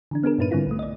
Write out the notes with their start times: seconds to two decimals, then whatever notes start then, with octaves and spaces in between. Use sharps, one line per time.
0.11 D3 E3 D4
0.23 B3 D4 G#4 A#4
0.39 G2 A#2 D#4 B4 D#7
0.51 G#2 D3 G3 C4 E4 F4
0.67 B1 A3
0.79 D5 D#5